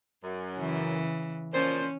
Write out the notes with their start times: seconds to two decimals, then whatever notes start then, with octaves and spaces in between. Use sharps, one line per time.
0.24 F#2
0.57 C#3 E3
1.54 A#2 F3 C#4 C5